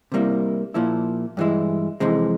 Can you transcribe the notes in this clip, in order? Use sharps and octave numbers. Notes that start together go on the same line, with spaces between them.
C3 G3 A#3 E4
A#2 F3 A#3 E4
G2 E3 G#3 E4
F2 C3 E3 G#3